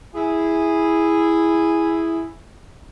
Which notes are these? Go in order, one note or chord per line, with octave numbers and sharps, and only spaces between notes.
E4 G#4